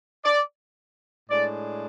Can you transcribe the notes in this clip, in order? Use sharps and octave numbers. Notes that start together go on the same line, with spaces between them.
D5
A2 G#3 D4 D5